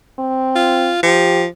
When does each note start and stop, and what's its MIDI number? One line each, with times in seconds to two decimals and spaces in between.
0.19 0.91 60
0.56 1.02 65
1.03 1.47 53
1.03 1.43 67